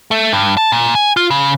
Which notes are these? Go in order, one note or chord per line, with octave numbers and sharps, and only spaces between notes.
A3
G2
A5
A#2
G#5
F4
C#3